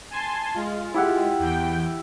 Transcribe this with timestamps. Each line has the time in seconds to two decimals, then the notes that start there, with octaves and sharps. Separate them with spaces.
0.11 G#5 A5 C6
0.54 G#3 F4
0.94 E4 G4 F#5
1.39 E2 G5